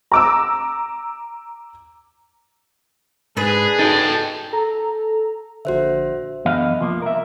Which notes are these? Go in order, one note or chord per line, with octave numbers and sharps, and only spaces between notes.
A#5 D6 E6
G#2 D4 G#4 B4
D#4 F#4 A4 G5
A4 A#5
A#1 D3 F#4 C5 E5
F#2 D3 E3 B3 D#5 F5
C2 F3 A#3
A#4 E5